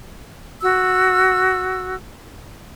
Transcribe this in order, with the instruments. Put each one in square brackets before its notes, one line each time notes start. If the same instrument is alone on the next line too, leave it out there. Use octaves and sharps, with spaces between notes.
[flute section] F#4 E6